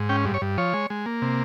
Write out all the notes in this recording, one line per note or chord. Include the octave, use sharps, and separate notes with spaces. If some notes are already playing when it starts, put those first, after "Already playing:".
Already playing: G#2
C#4 G5
G2
C#5
G2
F3 C#5
G#3
G#3
A#3
C3